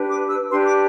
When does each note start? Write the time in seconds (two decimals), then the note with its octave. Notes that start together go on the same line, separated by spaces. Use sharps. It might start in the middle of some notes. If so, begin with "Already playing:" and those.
Already playing: D4 G4 B4
0.09 D6
0.29 E6
0.50 D4 G4 B4 C6
0.65 D6